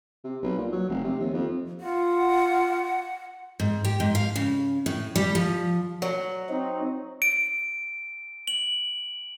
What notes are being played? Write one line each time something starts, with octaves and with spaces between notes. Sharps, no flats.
C3
B1
A#2
F#3
F1
C3
D#2
F2
F4 F#5
G#2
G4
G#2
F5
C#3
A2
G3
F3
F#3
C4 D#4
D7
F#7